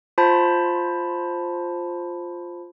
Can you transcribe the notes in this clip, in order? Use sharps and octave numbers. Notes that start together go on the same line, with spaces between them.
F4 C5 A5 B5